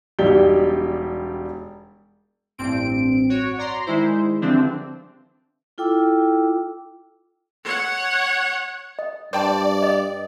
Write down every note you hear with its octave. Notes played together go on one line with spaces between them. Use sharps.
E1 G3 D#4 G4 D5 G7
A1 G2 C4 D7
F#4 C#5
D5 A#5 C6
D#3 G#3 E4 C5
D3 E3 F3 G3 C4 D4
E4 F4 A4 G5 D6 E6
C#5 F#5
D#5
G2 C5 D5 G5 A5
D#5